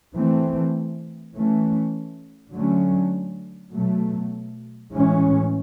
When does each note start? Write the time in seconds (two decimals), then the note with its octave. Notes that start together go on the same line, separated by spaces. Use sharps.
0.15 E3 A3 C4
1.34 E3 A3 C#4
2.52 D3 F#3 A3 C#4
3.72 B2 F#3 A3
4.92 A2 E3 G#3 C#4